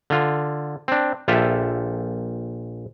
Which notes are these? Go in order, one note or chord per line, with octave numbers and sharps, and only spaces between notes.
D3 F4
C4 D4
A#1 F4 G4 A4 E5